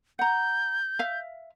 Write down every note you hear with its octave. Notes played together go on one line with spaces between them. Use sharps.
F#5 A#5 G6
E5 F5